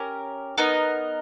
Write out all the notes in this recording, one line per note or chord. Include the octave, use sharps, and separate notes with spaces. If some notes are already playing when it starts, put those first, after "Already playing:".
Already playing: C#4 G4 A#4
B3 D#4 A#4 D#5